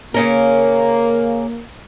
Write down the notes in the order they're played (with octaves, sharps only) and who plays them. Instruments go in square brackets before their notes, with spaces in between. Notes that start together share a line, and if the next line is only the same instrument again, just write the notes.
[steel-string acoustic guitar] C#3 C#4 A#4 [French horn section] A#3